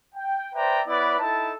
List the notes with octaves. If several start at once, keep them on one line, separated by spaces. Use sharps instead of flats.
G5
B4 C5 D5 E5 G5 A#5
B3 E4 B4 C#5 D5
D#4 E4 A4 A5